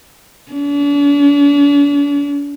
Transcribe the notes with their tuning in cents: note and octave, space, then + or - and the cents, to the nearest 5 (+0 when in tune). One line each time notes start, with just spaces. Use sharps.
D4 -45